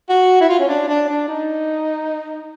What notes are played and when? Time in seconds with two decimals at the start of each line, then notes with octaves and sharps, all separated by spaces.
0.09 F#4
0.41 E4
0.49 F4
0.60 C#4
0.68 D4
0.88 D4
1.08 D4
1.28 D#4